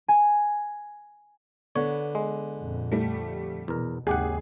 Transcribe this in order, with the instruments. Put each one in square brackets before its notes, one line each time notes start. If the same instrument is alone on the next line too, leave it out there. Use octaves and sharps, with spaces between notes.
[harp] G#5
[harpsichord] D3 [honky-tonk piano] B3 [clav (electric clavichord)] C#5
[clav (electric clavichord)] G#3
[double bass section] F2 A#2
[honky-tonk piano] G3 A3
[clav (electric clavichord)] E2 A#4 [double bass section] B2
[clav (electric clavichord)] G#1 G4 F#5 [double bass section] D#2 C#3 [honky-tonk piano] G#4